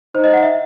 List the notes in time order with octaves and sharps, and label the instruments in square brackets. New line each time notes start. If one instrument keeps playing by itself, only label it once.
[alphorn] D#4 [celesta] C5
[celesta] D#5
F#5
E5